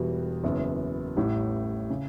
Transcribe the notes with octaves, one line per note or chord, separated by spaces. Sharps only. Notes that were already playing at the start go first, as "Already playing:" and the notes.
Already playing: E1 E2 B2 G3
F#1 F#2 E3 B3
A1 A2 G3
C#3